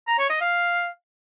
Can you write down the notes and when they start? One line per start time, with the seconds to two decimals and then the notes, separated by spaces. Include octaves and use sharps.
0.07 A#5
0.18 C#5
0.30 D#5
0.41 F5